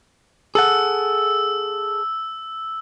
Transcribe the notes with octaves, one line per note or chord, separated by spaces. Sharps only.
G#4 A4 F#5 E6